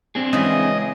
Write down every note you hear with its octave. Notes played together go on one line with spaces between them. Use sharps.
C4 D4 G#4
C#3 E3 G#3 D#5